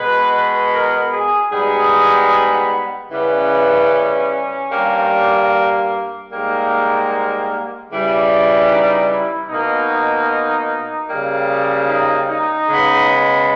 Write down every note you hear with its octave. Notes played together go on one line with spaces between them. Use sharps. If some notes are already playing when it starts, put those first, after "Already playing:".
Already playing: B2 G#3 B3 B4
A#4
G#4
G#2 G3 B3 G#4
C#3 E3 G3 B3 C#4
G2 G3 A#3
G#2 G3 A#3
C#3 E3 G3
D#4
E4
B2 A#3 D#4
C#3 G3 A#3
D#4
D#4
C#3 G#3 B3